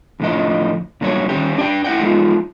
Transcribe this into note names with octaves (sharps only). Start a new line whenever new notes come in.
E2 A2 D3 F3 D#5
A#2 D3 F#3 G3 B4 C#5
D#3 G3 C#4 G4
D4 D5 G5
A3 E4 F#5 G5
G#3 D#4 F4